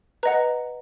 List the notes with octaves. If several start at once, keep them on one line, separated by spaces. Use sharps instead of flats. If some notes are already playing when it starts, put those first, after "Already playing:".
B4 D#5 F#5 A#5